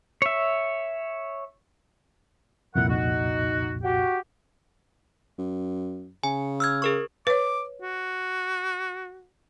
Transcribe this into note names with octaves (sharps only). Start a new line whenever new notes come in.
C#5 E5
C2 F2 A#2 E4 A#4 F#5
D#4 F#4
F#4 G4
F#2
C#3 G#5
E6 F6 G#6
G#4 A#4 C#6
B4 C#5 D6
F#4